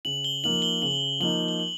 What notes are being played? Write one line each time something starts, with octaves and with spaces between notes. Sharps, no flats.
C#3 F#7
G7
F3 A#3 D#4 F#7
G7
C#3 F#7
F3 A#3 D#4 F#7
G7
F#7